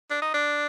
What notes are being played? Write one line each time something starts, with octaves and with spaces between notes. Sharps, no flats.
D4
D#4
D4